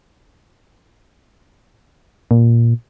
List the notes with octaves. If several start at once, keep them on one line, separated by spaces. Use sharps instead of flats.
A#2